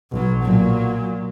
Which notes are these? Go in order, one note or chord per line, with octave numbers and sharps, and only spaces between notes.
B1 F#3
A#2 F#3